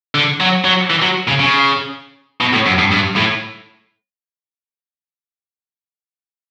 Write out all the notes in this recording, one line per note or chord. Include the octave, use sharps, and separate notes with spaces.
D3
F#3
F#3
E3
F#3
C#3
C#3
B2
A2
F#2
G2
G2
A2